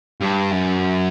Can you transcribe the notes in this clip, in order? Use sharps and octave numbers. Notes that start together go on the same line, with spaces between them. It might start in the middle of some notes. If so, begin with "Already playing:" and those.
G2
F#2